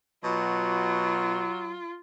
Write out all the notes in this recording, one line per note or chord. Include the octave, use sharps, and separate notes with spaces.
B2 F#3 F4